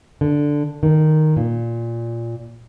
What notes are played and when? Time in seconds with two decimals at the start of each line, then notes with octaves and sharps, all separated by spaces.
0.21 D3
0.83 D#3
1.36 A#2